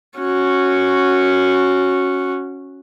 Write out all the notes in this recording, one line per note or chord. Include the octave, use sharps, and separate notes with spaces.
C#4 F#4